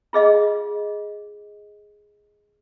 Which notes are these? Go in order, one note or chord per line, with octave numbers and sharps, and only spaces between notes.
F4 G#4 D#5 F5